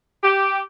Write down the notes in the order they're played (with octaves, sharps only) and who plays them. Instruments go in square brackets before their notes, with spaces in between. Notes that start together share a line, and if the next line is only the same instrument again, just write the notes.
[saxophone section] G4